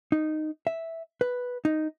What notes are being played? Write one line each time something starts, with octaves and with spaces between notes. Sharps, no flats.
D#4
E5
B4
D#4